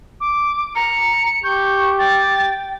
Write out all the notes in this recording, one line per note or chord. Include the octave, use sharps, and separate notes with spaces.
D6
A#5 C#7
G4 C#6 G6
G5 A6